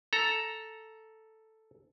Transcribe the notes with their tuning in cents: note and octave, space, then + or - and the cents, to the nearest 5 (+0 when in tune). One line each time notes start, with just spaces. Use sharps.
A4 +0 A#5 +5